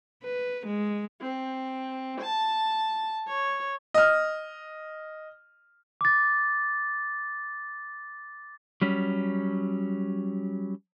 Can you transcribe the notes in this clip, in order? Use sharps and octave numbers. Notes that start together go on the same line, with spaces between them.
B4
G#3
C4
A5
C#5
D#5 F6
D6 A6
F#3 G3 C#4